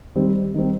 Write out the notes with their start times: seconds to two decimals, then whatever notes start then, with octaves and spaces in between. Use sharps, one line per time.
0.15 D#3 G3 C4
0.54 D#3 G3 C4